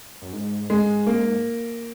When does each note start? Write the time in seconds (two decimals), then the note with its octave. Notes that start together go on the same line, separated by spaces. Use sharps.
0.22 F#2
0.33 G#2
0.70 G#3
1.07 A#3